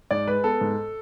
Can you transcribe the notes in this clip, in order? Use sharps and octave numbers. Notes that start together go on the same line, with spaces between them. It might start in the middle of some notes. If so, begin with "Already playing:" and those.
G#2 D5
G#3 B4
B3 A4
G#2